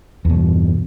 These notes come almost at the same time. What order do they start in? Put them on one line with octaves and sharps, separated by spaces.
E2 B2 G2